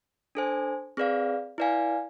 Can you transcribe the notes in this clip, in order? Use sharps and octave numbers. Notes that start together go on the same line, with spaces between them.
D4 A4 C5 G#5
C4 G#4 B4 D5 F5
E4 B4 D5 F5 G#5